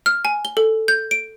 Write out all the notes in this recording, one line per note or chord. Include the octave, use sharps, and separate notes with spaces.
F6
G#5
G7
A4
G6
D7